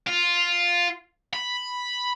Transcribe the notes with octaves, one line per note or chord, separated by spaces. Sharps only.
F4
B5